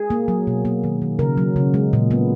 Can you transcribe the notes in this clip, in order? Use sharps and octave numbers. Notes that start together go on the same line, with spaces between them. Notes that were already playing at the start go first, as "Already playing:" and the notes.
Already playing: G#4
A#3
F#3
B2
A#3
D#3
D#3
C#3 A#4
F#3
C#3
G#3
A#2
B3